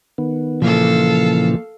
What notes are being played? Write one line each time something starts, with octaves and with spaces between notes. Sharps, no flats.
D#3 B3
A#2 C#3 E3 F3 A#3 A4 F5